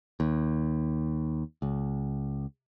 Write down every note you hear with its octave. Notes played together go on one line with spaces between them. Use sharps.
D#2
C#2